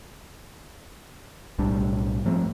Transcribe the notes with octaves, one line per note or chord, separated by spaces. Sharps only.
B1 A2 G3 D4
G#2 F3 A3 C4